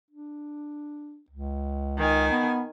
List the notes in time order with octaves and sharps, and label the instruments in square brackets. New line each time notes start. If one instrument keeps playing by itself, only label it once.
[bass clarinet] D4
C#2
[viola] D#3 G#5
[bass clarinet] B3